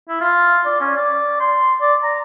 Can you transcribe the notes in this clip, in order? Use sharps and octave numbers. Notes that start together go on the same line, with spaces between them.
E4
F4
D5
C#4
D5
C6
D5
A#5